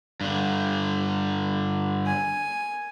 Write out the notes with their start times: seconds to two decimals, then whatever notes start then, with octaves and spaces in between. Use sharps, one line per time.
0.21 G2 D3
2.06 G#5